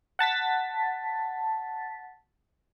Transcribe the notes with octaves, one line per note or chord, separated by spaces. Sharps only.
F#5 A5 A6 B6